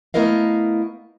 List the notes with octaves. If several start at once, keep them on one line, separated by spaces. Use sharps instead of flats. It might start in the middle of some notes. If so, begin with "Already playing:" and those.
A3 B3 E4 A#4 D#5 F5